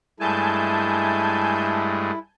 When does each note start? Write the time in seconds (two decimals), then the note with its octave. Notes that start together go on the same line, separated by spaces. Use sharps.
0.20 G2 G#3 A3 E4 G#5 A5 G6